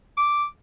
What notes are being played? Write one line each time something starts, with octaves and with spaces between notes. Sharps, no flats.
D6